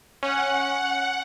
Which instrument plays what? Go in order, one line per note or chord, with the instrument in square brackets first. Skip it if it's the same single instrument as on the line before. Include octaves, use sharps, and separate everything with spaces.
[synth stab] C#4 [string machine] F#5